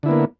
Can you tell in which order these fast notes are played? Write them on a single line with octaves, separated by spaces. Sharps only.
D3 E4 B3 A#3